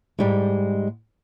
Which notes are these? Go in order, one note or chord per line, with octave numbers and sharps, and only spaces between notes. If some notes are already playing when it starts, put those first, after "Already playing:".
G#2 G3 G#3